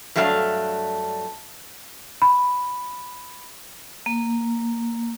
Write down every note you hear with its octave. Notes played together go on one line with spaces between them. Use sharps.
G2 F#3 A3 D4 G#4 F5
B5
A#3